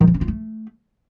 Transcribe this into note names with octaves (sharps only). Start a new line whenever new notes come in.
D#3
E3
C#4
F4
A3